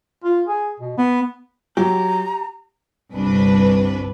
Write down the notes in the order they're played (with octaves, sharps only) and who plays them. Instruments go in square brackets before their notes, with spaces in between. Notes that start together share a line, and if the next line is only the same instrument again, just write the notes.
[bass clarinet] F4
G#4
B2
B3
[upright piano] F#3 [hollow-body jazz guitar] G4 [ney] A#5
[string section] G1 C2 D4 B4